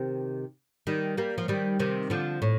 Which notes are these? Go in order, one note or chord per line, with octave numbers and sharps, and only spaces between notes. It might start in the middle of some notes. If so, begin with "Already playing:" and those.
Already playing: C3 D#3
D#3 G3
G3 A#3
F3
D#3 G3
C3 D#3
D3 F3
A2